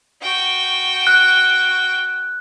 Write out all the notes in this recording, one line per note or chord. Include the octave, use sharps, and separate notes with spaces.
F#4 G5
F#6